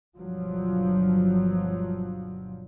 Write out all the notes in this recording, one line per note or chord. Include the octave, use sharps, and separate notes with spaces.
G1 G2 B2 F3 F#3